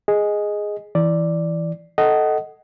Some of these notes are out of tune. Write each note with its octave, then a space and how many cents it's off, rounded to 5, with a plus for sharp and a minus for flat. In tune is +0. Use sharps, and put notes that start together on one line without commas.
G#4 +0 D#5 +0
E3 +0 D5 +0
A4 +0 D#5 +0 F#5 +25